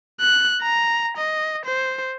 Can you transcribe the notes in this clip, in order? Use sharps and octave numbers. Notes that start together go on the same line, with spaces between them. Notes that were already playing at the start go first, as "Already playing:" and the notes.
F#6
A#5
D#5
C5